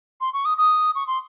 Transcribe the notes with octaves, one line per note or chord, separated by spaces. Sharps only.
C6
C#6
D#6
D#6
C#6
C6